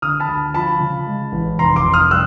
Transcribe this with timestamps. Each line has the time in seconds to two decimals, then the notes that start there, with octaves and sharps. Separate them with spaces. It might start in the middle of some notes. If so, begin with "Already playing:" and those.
0.02 D3 D#6 F6
0.20 A5 B5
0.28 D2
0.54 F3 A5 B5
0.80 C#3
1.07 G#3
1.32 A1
1.58 F1 A#5 C6
1.76 C6 D6
1.84 F1
1.94 D#6 F6
2.11 G3 E6 F#6